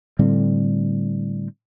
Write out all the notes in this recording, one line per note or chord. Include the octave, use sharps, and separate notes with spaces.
A2 D3 G3 C4